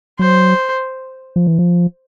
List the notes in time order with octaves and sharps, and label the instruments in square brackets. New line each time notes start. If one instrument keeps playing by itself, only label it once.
[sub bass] F#3 [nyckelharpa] C5
[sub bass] F3
E3
F3